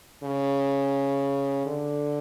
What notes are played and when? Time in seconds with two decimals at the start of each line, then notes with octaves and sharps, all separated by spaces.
0.23 C#3
1.66 D3